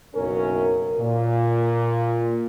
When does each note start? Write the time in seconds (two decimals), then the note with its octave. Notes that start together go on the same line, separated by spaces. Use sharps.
0.15 F#1 B1 F#2 C#4 A#4
0.98 A#2